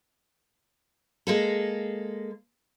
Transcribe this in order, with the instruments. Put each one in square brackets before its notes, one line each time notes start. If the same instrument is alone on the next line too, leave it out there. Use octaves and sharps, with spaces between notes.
[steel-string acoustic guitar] G#3 A#3 A4